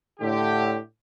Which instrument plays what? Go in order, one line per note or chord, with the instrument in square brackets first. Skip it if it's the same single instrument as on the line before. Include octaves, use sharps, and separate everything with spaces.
[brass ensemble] A2 D3 G4